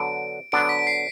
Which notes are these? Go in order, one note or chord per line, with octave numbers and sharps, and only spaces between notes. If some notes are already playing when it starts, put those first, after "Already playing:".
Already playing: D3 F#3 B3 D4 D7
D3 F#3 B3 D4 D7
B6
D7
C7